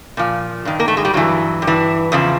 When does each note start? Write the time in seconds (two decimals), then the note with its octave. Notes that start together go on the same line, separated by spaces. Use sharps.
0.17 A#2 F3
0.65 G2 D#3
0.80 A#3
0.88 A3
0.97 G#3
1.05 G3
1.14 G2 E3 F#3
1.62 G2
1.67 E3
2.12 E2 C#3 F3